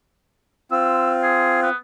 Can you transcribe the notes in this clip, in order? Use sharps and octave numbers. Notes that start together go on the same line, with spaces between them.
C4 F4 E6
G#4
B3